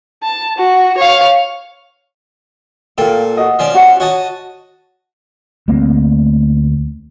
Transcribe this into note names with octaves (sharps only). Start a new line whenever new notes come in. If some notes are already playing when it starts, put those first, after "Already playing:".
A5
F#4
C#5 F5
A#2 F4 A4 G5
F#4 D#5
F3 C#4 D5
F#4 F#5
F#4 C#5 D#5 A5
D2 A3 A#3 C4